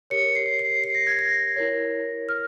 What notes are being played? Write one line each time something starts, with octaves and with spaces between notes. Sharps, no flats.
G4 A#4 C#5 C#7
C7
C7
C7
A#6
G#6
A#6
E4 A#4 C#5
F6